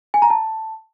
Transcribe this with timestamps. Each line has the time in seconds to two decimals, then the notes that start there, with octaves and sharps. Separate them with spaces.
0.14 G#5
0.22 A#5
0.30 A5